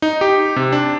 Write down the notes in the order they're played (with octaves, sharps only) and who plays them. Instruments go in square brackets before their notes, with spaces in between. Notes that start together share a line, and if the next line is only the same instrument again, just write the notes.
[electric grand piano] D#4
G4
C3
D4